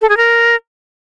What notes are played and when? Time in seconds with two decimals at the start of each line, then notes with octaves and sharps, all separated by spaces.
0.01 A4
0.09 G#4
0.17 A#4